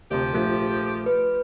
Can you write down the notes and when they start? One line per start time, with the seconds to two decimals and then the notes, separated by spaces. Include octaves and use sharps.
0.11 D2 C3 F3 G4
0.33 A#1 A3 F4
1.06 B4